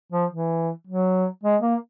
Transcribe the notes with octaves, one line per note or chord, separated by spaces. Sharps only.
F3
E3
F#3
G#3
A#3